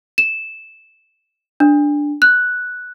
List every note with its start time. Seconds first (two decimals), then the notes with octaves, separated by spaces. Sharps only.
0.18 E7
1.60 D4
2.22 F#6